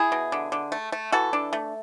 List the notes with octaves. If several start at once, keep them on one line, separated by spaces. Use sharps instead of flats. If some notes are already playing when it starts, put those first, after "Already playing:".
Already playing: E4 G#4
B2
D3
D3
A3
A3
E3 F#4 A4
D4
A3